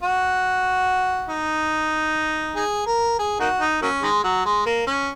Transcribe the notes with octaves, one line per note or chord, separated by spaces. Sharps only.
F#4
D#4
D#4 G#4
A#4
G#4
A#3 D#4 F#4
D#4
F#3 A#3 C#4
D#3 G#3
F#3
G#3
A#3
C#4